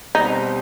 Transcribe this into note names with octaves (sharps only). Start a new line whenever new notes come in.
B2 G3 C4 D#4